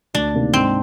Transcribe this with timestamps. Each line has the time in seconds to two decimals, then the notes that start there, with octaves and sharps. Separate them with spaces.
0.14 D2 D4
0.34 C3 D#3 A#3
0.53 G#2 C4